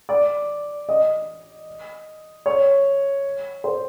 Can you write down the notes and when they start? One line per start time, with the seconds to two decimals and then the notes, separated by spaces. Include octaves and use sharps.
0.09 D5
0.89 D#5
2.46 C#5
3.64 C5